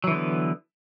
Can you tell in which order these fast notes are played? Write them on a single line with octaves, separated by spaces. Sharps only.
F#3 E3 D3 B3